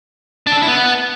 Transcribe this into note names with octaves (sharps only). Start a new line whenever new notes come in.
D4
A4
D4
E4
B3